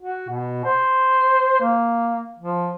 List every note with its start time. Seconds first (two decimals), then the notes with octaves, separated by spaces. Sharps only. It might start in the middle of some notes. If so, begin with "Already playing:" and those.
0.01 F#4
0.29 B2
0.65 C5
1.60 A#3
2.39 F3